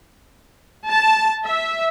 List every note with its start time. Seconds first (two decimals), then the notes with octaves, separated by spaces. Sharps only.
0.89 A5
1.44 E5